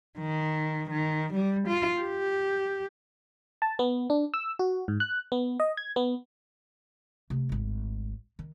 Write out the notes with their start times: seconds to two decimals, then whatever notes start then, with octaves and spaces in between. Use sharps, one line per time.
0.19 D#3
0.91 D#3
1.34 G3
1.68 F4
2.01 G4
3.62 A5
3.79 B3
4.10 D4
4.34 E6
4.59 F#4
4.88 G#2
5.00 F#6
5.32 B3
5.60 D#5
5.77 G#6
5.96 B3
7.30 C3 A3
7.49 D1 G#1
8.39 D#3